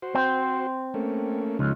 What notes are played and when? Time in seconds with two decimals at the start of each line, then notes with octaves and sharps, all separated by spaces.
0.02 F#4 C5
0.15 C4
0.94 A3 A#3 C#4
1.59 C#2 F3 C#4 D#4